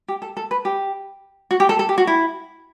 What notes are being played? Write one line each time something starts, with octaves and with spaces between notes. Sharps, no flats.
G4
A4
A4
B4
G4
F#4
G4
A4
A4
G4
F#4
E4